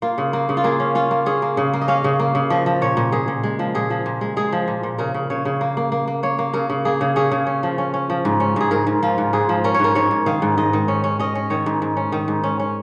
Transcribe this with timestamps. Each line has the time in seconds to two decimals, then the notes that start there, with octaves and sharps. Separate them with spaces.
0.02 A#3 F4
0.18 C#3
0.33 A#3
0.49 C#3
0.57 F4
0.64 A#3 G#4
0.80 C#4
0.95 C#4 F4
1.11 A#3
1.26 C#4 G#4
1.42 A#3
1.57 C#3
1.73 A#3
1.81 D#5
1.88 C#4 F5
2.04 C#3
2.20 A#3
2.35 C#3
2.50 F3 D#5
2.66 F3
2.82 A#2 C#5
2.97 A#2
3.12 A#2 G#4
3.28 A#2
3.43 G#3
3.59 F3
3.75 A#2 G#4
3.90 F3
4.06 A#2
4.21 G#3
4.37 G#3 G#4
4.53 F3
4.68 A#2
4.83 A#2
4.98 C#3 A#4
5.14 C#3
5.30 C#3 C#5
5.45 C#3
5.61 A#3
5.77 A#3
5.92 A#3
6.07 A#3
6.23 A#3 C#5
6.39 A#3
6.53 C#3 A#4
6.70 C#3
6.85 A#3 G#4
7.01 C#3
7.16 C#4 G#4
7.31 C#3
7.47 C#4
7.63 F3
7.78 C#4
7.94 C#4
8.10 F3
8.25 G#2
8.40 C#4
8.56 G#2 G#4
8.71 G#2 A#4
8.87 G#2
9.03 F3 F4
9.18 G#2
9.33 G#2 G#4
9.49 F3
9.64 C#4 A#4
9.74 C#5
9.79 G#2 A#4
9.95 G#2 C#5
10.11 G#2
10.26 D#3 F5
10.42 G#2
10.58 G#2 D#5
10.73 D#3
10.88 C#4
11.04 C#4
11.19 C#4 D#5
11.35 C#4
11.50 D#3 C#5
11.66 G#2
11.82 G#2
11.97 C#4
12.12 D#3
12.28 G#2
12.44 C#4
12.60 C#4